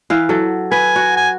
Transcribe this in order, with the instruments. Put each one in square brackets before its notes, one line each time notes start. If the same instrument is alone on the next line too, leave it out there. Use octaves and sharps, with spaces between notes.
[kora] E3 F5
F#3 A4
[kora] B4 [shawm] G#5
[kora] F#4
[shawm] G#5